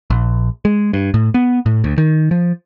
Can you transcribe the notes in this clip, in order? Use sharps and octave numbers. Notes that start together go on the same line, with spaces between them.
A#1
G#3
G2
A2
B3
A2
D2
D#3
F3